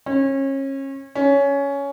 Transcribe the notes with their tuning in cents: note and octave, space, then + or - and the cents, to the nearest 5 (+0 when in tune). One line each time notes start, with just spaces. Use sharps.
C#4 -30
C#4 +15